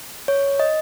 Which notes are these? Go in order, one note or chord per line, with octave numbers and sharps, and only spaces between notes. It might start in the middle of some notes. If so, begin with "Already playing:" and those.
C#5
D#5